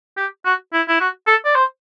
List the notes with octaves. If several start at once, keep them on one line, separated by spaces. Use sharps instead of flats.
G4
F#4
E4
E4
F#4
A4
D5
C5